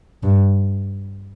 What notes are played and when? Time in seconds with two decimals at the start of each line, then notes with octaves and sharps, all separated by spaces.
0.23 G2